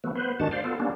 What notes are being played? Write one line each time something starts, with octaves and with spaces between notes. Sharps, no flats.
E3 F#3 A3 B3
B3 B4 C5
G2 D#3 G#3 D4 F#4 A5
C5 D5 F5
B3 F4 A4
G3 A#3 B3 C#4 D4